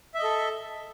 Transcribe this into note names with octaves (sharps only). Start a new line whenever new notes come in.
A4 D#5 E5